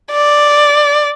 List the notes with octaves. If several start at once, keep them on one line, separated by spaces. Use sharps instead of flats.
D5